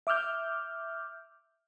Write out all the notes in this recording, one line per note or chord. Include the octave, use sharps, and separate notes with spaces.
E5 D6 E6 F6 G6